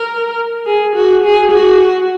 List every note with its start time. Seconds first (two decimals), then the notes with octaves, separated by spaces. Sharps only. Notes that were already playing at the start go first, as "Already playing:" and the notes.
Already playing: A#4
0.66 G#4
0.95 F#4
1.23 G#4
1.51 F#4